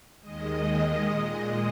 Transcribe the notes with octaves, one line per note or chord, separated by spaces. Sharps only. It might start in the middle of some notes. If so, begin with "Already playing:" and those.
D#2 D#3 G#3 D#5
D#5
A#2 G#3 D#5